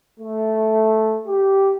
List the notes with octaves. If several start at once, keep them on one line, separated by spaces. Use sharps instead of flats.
A3
G4